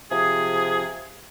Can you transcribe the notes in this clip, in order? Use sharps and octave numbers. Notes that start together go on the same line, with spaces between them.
C3 F3 G#4